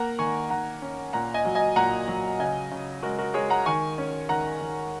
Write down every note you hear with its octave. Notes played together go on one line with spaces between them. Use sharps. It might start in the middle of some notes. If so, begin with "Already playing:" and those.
Already playing: A#3 F#5 A#5
D#3 G#5 C#6
D#3 F#5 A#5
C#4
A#2 F#5 A#5
D#5 G#5
F#3
D#5 G#5
A#2 F#5 A#5
F#3
C#3 D#5 G#5
C#3
G#3 F#4 A#4
F#4 A#4
G#3 G#4 C#5
F#5 A#5
D#3 G#5 C#6
C#4
D#3 F#5 A#5
D#3